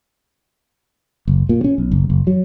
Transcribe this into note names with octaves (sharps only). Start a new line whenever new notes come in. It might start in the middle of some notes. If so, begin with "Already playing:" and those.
F#1
A#2
C#4
B1
F#1
F#1
F#3